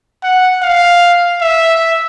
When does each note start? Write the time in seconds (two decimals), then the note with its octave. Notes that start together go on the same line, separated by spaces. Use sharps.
0.23 F#5
0.62 F5
1.41 E5